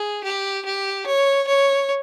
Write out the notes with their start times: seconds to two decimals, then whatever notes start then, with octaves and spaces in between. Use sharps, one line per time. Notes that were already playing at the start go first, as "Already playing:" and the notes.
Already playing: G#4
0.24 G4
0.65 G4
1.06 C#5
1.47 C#5